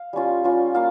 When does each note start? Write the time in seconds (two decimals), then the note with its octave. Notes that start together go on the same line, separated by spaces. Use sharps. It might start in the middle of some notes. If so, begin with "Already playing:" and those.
Already playing: F5
0.13 G3 C#4 F4
0.44 G3 C#4 F4
0.74 A#3 F4 F5